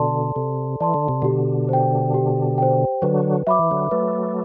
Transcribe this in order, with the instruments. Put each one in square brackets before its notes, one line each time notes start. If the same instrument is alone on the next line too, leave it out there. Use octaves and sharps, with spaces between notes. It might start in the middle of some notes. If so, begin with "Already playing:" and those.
Already playing: [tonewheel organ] B2 D3 [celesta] A4 D5 A5 C6
[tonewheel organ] C3 [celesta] A4
[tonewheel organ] E3 [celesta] D5 A5 C6
[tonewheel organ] D3
C3
[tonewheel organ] B2 D3 [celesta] G4
[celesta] C5 G5
G4
C5 G5
[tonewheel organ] D3 F#3 [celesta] B4
[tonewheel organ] F#3 [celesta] E5 B5 D6
[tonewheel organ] E3
D3 F#3
[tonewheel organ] F#3 A3 [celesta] B4